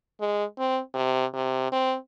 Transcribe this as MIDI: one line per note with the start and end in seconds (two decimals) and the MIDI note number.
0.21 0.44 56
0.59 0.80 60
0.94 1.25 48
1.34 1.69 48
1.72 1.95 60